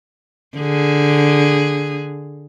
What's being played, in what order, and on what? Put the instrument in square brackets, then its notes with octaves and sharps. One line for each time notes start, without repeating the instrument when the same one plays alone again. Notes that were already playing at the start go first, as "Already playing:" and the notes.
[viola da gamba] D3 G#4